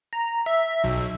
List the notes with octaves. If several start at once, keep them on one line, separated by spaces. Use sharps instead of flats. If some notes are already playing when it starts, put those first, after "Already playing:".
A#5
E5
B1